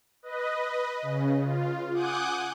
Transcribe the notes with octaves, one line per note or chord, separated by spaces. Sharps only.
B4 D#5
C#3
F4
F#5 G#5 D6 D#6 F#6 G6